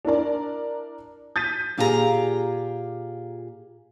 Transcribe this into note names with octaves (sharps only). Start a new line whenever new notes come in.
D4 E4 A#4 D5
G6 A6 B6 D#7
A#2 F4 G4 G#4 B4 A#5